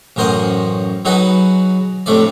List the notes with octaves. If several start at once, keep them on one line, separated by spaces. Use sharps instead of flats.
A1 F#2 A#4 C5 D#5 F#5
F#3 D#4 F#4 G#4 B4 F#5
F2 A2 C3 A3 D4 D5